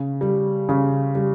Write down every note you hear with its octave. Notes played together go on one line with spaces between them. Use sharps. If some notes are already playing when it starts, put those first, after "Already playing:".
Already playing: C#3
G3
C#3
G3